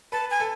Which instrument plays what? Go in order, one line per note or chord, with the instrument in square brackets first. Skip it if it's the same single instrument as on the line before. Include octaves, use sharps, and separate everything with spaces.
[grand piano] B4 [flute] A5
[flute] G#5
[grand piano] A4